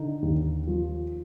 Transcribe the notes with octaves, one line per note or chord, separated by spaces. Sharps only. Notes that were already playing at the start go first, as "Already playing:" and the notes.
Already playing: D3 D#4
D#2
F3